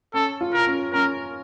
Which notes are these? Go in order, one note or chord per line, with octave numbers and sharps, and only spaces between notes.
C#4 A4
F4
A#4
C#4
C#4 A#4